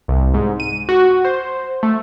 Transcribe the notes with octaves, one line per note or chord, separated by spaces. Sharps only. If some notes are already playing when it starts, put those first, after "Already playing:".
C2
G#2
D#7
F#4
C5
A3